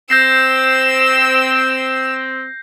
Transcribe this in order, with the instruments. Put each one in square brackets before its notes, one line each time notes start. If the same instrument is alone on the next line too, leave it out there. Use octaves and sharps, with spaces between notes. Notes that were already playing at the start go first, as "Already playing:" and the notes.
[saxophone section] C4 [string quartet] E6 [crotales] G6 A#6 C7